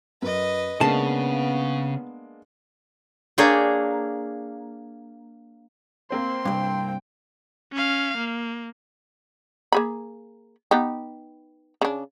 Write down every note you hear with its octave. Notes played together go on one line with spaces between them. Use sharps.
F#2 B4 D#5
C#3 G#3 A#3 B3 D4 A5
A#3 D4 G#4 C#5 G5
A#3 C4 C5 C6
C2 G2 G5
C#4 F5
A#3
A#3 G#4 B5
B3 D#4 G4
C#3 D4